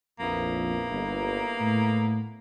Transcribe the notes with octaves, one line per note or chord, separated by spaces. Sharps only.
A#1 F2 A#3 B3 E4
G1
A2